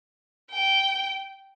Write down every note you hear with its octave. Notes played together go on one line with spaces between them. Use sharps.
G5